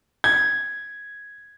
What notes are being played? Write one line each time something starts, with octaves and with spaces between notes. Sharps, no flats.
G#6